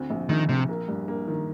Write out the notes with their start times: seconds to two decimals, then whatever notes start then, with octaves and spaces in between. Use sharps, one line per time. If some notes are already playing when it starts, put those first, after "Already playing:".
Already playing: D2 C4
0.10 A#1
0.29 A#1 D#3
0.49 A#1 C3
0.69 A#3
0.88 G2
1.08 A#3
1.28 D#3